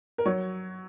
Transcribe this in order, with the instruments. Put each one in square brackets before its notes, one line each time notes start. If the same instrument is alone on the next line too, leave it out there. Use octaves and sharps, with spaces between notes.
[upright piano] A#4
F#3 C#5